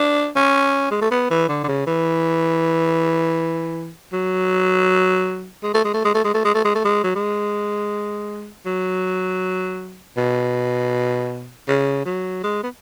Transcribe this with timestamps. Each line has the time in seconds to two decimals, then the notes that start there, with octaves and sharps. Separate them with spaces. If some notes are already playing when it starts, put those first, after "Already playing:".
Already playing: D4
0.36 C#4
0.91 G#3
1.01 A3
1.11 B3
1.30 E3
1.49 D3
1.64 D3
1.68 C#3
1.87 E3
4.13 F#3
5.64 G#3
5.74 A3
5.85 G#3
5.94 A3
6.04 G#3
6.14 A3
6.24 G#3
6.34 A3
6.44 G#3
6.55 A3
6.64 G#3
6.75 A3
6.84 G#3
7.04 F#3
7.15 G#3
8.66 F#3
10.17 B2
11.68 C#3
12.05 F#3
12.43 G#3
12.63 B3